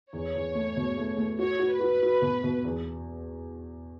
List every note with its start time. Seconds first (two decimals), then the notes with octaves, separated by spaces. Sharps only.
0.13 E2 C#5
0.35 E2
0.55 A3
0.77 B2
0.98 A3
1.17 A3
1.39 F#4 C#5
1.59 F#4
1.70 B4
1.80 F#4
2.02 F#4
2.22 B2
2.44 B2
2.64 E2